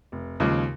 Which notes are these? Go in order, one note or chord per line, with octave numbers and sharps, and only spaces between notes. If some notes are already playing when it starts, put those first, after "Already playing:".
F1
D#2 C#3 F3 G#3